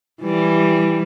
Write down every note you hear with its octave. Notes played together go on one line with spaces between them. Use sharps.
E3 G3